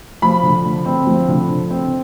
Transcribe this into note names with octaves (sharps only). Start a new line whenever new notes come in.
F3 B5
D3
D3
C4
F3
D3
D3
C4